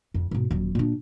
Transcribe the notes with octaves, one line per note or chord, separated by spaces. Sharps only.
F2
G#2 B2
D#1 F#3
A#2 D4